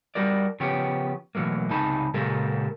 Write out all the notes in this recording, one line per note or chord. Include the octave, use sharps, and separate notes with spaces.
G3 F#4 A#4 D5
C#3 F3 B3 C#4 G4
B2 E3 F#3 A3 A#3
C#2 C3 D#4 G#5 A5 B5
A#2 C#3 G#3 G4 A4 A#4